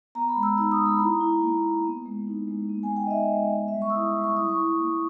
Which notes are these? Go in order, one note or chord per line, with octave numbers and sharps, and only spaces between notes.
B3 A#5
B5
G#3
E6
D#4 E6
D#6
G#3
B5
E4 A#5
E4
A#3
A#3
B3
G#3
D#4
G#3
B3
G#5
G#3
G5
D#5
D#4 E5
G#3
B3
E5
G3
C#6
E6
E4 D#6
C#6
G3
C#6
E4 D#6
C#6
E4
A#3